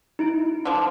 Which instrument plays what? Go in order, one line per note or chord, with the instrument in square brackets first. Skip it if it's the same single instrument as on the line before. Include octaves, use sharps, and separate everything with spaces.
[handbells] D#4 E4 D7
[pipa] D3 F3